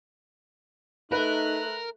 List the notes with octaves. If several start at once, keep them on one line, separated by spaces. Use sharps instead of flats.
A3 D#4 A#4 B4 F#6